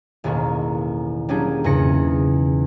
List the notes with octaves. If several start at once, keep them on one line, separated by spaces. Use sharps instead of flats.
E1 A1 D#3 A#3 C#6
F#3 G3 A#3 C#4 D4 G#4
E2 G#2 C#3 C#4 A#6 C#7